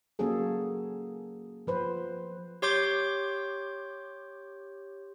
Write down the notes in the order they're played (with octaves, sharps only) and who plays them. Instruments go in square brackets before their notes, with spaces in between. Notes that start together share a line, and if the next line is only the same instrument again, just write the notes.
[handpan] F#3 A#3 C#4 G#4 A4
F3 B4 C5
[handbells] G4 C#5 C6 D6 G6